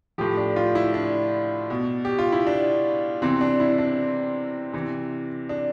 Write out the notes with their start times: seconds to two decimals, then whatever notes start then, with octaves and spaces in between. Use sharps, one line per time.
0.18 A2 F3 G4
0.37 D4
0.56 F4
0.75 E4
0.94 D4
1.70 B2
2.05 G4
2.19 F4
2.32 E4
2.47 D4
3.22 C3 E3 C4
3.41 D4
3.60 E4
3.78 D4
4.73 C3 E3
5.49 D4